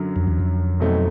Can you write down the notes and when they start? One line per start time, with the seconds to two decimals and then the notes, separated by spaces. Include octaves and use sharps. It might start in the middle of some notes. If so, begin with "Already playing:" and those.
Already playing: F#2 D3 F#3
0.16 F2
0.27 E2
0.40 F2
0.80 B2 F#3 A3 C4 D#4